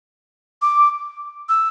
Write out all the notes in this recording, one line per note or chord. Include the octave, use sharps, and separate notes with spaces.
D6
E6